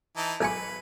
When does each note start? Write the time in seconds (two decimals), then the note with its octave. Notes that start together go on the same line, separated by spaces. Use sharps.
0.17 E3 D#4 A5
0.41 B1 B4 G#5 C#6